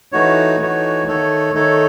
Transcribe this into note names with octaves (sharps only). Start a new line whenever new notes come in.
E3 A3 D#4 F#4 C#5
E3 A3 D#4 F#4 C#5
D#3 A3 D#4 A4 C#5
D#3 A3 D#4 A4 C#5